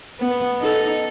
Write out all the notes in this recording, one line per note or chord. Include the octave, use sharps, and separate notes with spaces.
B3
D#4 A4